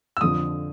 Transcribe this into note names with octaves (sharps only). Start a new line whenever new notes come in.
E6
F2 D3 F3 D#6